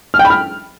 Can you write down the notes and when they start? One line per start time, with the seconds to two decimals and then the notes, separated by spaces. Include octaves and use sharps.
0.14 F6
0.19 G5
0.25 B5
0.30 F6